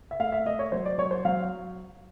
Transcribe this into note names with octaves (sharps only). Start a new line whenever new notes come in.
E5
A3 F5
E5
A3 D#5
C#5
F#3 C5
D5
F#3 C#5
C5
F#3 F5